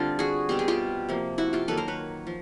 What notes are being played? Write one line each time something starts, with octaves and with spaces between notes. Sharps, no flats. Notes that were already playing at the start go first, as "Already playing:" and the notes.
Already playing: D3 G3 C4 D4 F4
F#4 G#4
B2 G3 C4 G4
G#4
F4 G4
C3 F3 A#3
E4 F#4
F4 G4
D#3 F#3 A#3 A4 B4
A#4 C5
B4 C#5
F3